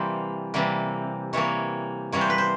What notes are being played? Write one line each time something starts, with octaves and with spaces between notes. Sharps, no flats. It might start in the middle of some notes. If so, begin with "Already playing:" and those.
Already playing: C3 E3 G3 A#3 C5
C3 E3 G3 A#3
C3 E3 G3 A#3 C#5
C3 E3 G3 A#3 C#5
C5
B4
C5